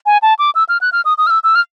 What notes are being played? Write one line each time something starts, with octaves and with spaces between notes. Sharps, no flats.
G#5
A5
D6
E6
F6
F#6
F6
D#6
D#6
F6
E6
E6
F6